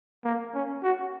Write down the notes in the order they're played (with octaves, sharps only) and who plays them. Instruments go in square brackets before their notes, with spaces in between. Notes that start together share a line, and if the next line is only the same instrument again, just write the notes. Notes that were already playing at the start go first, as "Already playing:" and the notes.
[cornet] A#3
C#4
F#4